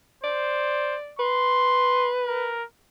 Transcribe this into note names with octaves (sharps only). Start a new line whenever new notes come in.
C5 D5
B4 C6
A#4